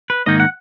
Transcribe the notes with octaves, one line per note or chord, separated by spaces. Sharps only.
B4
G#2 D#3 A#3 D#4 D#5
F#5